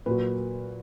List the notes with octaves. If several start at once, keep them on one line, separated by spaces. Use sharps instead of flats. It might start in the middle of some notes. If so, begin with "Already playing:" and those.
A#2 F#3 B4